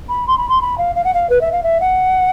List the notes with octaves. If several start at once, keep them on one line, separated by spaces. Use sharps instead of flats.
B5
C6
B5
C6
B5
F5
F5
F#5
F5
B4
E5
F5
E5
F#5